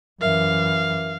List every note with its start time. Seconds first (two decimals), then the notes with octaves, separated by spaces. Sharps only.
0.21 F#2 E3 A#4 E5 F5